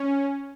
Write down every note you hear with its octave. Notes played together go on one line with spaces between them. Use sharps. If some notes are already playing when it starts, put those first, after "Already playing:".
Already playing: C#4